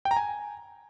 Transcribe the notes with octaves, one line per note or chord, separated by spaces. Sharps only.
G5
A#5
G#5